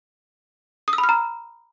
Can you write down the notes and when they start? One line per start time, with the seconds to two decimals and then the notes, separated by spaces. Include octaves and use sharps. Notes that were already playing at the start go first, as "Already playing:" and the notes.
0.88 D#6
0.93 E6
0.98 B5
1.04 F6
1.09 A#5